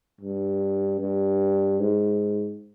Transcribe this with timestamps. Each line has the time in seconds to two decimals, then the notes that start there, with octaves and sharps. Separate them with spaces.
0.21 G2
1.01 G2
1.80 G#2